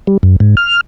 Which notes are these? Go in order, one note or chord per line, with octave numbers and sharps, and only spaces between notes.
G3
F#2
G#2
F6